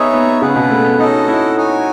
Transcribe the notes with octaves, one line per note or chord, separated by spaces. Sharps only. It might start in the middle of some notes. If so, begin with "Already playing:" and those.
Already playing: B3 D#4 G#4 C#5 E5
B3
C#3 G#4 B4 F#5
B2
A3
B3
C#4 D#4 F#4 A4 D#5 F#5
E4
D#4 F#4 C#5 G#5